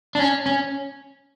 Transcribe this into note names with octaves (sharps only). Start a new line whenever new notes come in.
D4
C#4
C#4